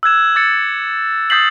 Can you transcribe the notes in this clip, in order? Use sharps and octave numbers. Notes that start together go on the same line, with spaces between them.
E6 F#6 G#6 E7
D6 A6 C#7
D#6 G6 A6 B6 C7 F#7